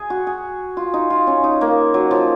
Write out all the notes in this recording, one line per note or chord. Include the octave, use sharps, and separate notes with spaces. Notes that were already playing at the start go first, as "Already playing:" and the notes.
Already playing: G#4
F#4
G#4
F4
D#4
F4
C#4
D#4
A#3
F#3
F3